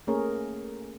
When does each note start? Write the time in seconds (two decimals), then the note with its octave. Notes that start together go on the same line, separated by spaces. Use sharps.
0.07 A3 A#3 C#4 G#4 A#4 C#5